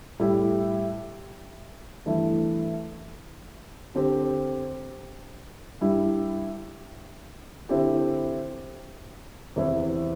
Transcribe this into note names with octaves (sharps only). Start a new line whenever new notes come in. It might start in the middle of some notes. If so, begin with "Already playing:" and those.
A2 G3 E4 G4
G2 E3 A3 E4
D3 C4 G4
G2 G3 E4 G4
D3 C4 E4 G4
E2 C3 E3 C4 E4